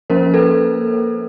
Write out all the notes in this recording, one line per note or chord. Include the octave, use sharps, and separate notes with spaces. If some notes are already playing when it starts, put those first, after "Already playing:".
F3 A#3 C#4 A#4 C5
A4 B4